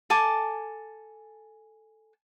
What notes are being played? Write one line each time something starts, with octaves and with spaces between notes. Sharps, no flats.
A4 G#5 A5 D6